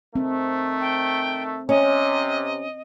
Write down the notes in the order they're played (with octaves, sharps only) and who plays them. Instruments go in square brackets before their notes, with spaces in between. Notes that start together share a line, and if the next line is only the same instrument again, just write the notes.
[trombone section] D#3 A3 [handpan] C4
[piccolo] G5
[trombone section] C3 [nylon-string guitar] C#4 [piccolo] D#5